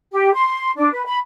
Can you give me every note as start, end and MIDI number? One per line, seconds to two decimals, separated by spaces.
0.11 0.31 67
0.32 0.69 84
0.76 0.90 62
0.91 1.04 71
1.05 1.17 83